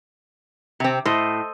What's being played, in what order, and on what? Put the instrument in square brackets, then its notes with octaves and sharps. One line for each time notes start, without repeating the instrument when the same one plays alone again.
[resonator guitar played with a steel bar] C3 C4
[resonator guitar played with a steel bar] A2 [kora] A4 C5 D#5